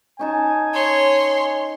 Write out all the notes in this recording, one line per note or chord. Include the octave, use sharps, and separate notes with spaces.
C#4 D#4 G#5 A5
C#5 C6